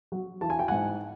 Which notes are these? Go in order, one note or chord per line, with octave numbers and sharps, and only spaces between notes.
F#3
E3 A5
G#5
G5
G#2 F#5 G#5